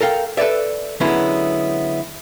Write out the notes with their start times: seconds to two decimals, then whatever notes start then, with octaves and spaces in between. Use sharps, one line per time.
0.01 A4 A#4 F5 G5
0.37 A4 B4 C#5 D5 E5
1.00 D3 F#3 G#3 B3 C#4 E4